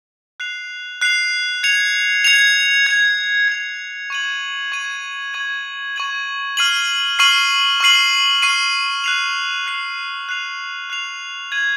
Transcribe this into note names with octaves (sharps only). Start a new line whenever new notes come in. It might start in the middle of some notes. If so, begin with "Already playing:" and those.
F#6 C7 F7
F#6 C7 F7
G#6 C#7 F7
G#6 C#7 F7
G#6 C#7 F7
G#6 C#7 F7
C#6 G#6 D#7 F#7
C#6 G#6 D#7 F#7
C#6 G#6 D#7 F#7
C#6 G#6 D#7 F#7
C#6 F6 C7 D#7 F#7
C#6 F6 C7 D#7 F#7
C#6 F6 C7 D#7 F#7
C#6 F6 C7 D#7 F#7
F#6 C7 F7
F#6 C7 F7
F#6 C7 F7
F#6 C7 F7
G#6 D#7 F#7